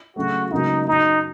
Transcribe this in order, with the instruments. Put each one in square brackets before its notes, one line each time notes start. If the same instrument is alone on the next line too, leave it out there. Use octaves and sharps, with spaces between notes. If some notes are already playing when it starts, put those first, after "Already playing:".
[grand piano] C#3 F#3 A3 [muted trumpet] F#4
[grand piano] C#2 C#3 F#3 A#3 [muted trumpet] D#4
[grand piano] F#2 C#3 F#3 [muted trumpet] D#4